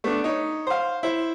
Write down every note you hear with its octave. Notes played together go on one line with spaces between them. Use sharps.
A3 B3 D4
D#4 C#5
C5 F5
E4 C5